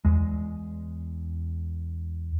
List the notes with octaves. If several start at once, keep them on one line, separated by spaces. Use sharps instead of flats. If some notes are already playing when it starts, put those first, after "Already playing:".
E2 G#3